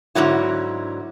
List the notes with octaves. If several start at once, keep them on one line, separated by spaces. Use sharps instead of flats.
G#2 D3 F#3 E4